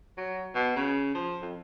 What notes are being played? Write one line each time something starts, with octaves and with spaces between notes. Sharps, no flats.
F#3
B2
C#3
F3
F2